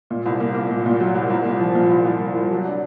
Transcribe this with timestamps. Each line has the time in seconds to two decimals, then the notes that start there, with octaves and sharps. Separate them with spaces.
0.10 A#2
0.26 C2
0.40 A#3
0.55 A#3
0.71 A#2
0.86 A#2
1.00 F#3
1.15 C2
1.30 C2
1.45 A#2
1.60 F3
1.75 A#2
1.90 C2
2.05 C2
2.21 C2
2.35 C2
2.51 F#3
2.65 D4